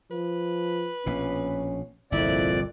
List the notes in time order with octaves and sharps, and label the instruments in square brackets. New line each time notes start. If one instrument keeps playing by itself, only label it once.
[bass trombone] F3 [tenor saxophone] B4
[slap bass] A#1 B2 [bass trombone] C#4
[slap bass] G1 C2 [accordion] F2 D5 [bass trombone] A#2 [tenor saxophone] E4